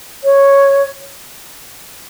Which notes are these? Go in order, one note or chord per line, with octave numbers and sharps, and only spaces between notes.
C#5